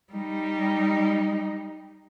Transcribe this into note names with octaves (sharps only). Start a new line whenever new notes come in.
G3 D#4